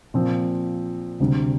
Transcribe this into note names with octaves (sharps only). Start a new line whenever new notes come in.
A#2 F3 C4
D2 C3 G3 D4